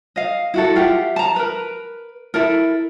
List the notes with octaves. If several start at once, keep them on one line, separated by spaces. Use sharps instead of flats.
D#5 F5
E4 F#4 A4
F4 G4 E5 F#5
A5 A#5
A#4 B4
E4 A4 A#4